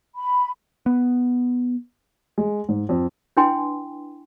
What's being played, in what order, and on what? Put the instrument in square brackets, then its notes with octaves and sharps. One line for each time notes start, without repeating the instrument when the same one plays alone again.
[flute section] B5
[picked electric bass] B3
[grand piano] G#3
G#2
F2
[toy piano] D4 E4 B4 G5 G#5 C6